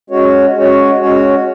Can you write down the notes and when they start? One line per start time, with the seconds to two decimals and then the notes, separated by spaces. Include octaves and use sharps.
0.10 G#3 C#4 F#4 C#5
0.54 G#3 C#4 F#4 C#5
1.00 G#3 C#4 F#4 C#5